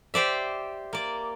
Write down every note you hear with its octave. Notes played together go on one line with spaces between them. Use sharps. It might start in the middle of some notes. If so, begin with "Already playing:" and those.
G4 C5 D5 E5
A#3 D5